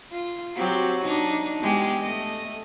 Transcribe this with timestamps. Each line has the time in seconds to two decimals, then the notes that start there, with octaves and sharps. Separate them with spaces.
0.12 F4
0.56 F#3 C4 G4
1.02 D4 D#4
1.60 E2 G#3 G4
2.02 A3 D#5